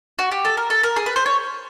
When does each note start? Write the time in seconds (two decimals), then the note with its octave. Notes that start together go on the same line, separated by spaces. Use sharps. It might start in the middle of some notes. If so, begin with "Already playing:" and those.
0.19 F#4
0.31 G4
0.45 A4
0.57 A#4
0.70 A4
0.83 A#4
0.96 G#4
1.06 B4
1.16 C5
1.26 C#5